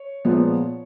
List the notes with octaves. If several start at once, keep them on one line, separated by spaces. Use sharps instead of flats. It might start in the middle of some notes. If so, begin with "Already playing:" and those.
Already playing: C#5
A#2 F3 G#3 B3